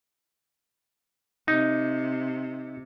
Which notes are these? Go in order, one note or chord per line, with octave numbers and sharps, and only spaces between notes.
C3 D#4